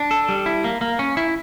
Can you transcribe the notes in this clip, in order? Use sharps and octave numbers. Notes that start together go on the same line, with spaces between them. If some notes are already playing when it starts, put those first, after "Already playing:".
Already playing: D4
A4
G3
E4
A#3
A#3
C#4
E4